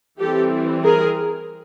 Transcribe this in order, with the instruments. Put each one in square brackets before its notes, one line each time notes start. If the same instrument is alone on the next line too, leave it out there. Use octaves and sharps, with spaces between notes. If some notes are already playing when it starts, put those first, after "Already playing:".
[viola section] E3 G3 C4 G4 A4
G#4 A#4